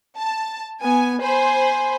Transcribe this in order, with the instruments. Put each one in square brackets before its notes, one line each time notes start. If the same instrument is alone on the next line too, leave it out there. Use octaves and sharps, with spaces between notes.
[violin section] A5
[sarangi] B3 [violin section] G#5
[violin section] C5 B5 [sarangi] G#5